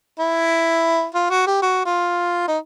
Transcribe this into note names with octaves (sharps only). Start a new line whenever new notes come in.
E4
F4
F#4
G4
F#4
F4
D#4